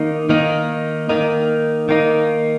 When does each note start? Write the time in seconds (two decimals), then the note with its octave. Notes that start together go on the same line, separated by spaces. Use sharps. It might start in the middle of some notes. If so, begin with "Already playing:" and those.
Already playing: D#3 A#3 D#4
0.29 D#3 A#3 D#4
1.09 D#3 A#3 D#4
1.89 D#3 A#3 D#4